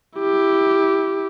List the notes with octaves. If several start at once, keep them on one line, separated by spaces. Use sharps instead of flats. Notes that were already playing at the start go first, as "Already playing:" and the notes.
E4 G4